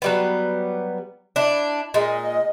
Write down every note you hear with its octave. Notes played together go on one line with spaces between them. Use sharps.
F#3 G3 B3
D4 E4
A#2 G#3 D#5